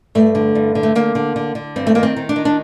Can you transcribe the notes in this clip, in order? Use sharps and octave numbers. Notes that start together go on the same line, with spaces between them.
G2 A3
D3
G2
D3
A3
D3 A#3
D3
D3
D3
G2 C4
A3
D#3 A#3
C4
D#3
D4
D#3
D4